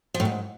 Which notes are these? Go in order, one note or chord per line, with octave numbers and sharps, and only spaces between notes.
F3
A2
G#2